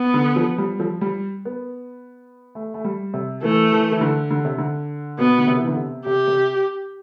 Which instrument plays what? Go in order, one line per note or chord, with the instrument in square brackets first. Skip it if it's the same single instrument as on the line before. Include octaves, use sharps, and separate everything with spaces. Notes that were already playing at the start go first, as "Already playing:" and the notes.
Already playing: [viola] B3
[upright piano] D3
F3
G3
F3
G3
B3
A3
A3
G3
C3
[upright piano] E3 [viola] A3
[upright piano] E3
E3
D3
D3
C3
D3
[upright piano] B2 [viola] B3
[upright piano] D3
C3
E3
D3
C3
[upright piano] C3 [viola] G4
[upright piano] C3